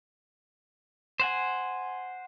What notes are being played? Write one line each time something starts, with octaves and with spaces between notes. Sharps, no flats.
C5 F#5 G#5